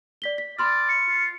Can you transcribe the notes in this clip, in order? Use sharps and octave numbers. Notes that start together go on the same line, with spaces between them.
D5 B6 G7
B6
D5 B5 C6 F6
C#7
F4